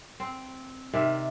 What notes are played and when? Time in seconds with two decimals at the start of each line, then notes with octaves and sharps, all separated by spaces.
0.20 C4
0.93 C3 D#3 D5 E5